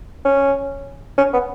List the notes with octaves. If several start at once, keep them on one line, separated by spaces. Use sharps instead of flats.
C#4
C#4
B3